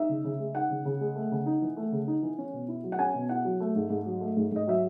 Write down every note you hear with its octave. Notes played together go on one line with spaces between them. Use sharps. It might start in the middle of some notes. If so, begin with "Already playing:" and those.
Already playing: D#4 E5
C#3
C#3
G#3
D#4 F#5
C#3
C#3
G#3
A3
C#3
D#4
E3
A3
C#3
D#4
E3
C#4
B2
E4
F#3
F#5
C#4 G#5
B2
E4 F#5
F#3
A3
G#2
G#2
F#3
A3
G#2
G#2 D#5
F#3 E5